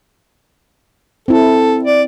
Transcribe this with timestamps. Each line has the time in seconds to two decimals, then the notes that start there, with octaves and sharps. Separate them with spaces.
1.28 C4 E4 A4
1.83 D5